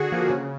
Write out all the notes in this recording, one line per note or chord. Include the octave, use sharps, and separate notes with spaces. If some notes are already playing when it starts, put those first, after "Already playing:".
Already playing: D3 F#4 G#4
F3 A#3
C#3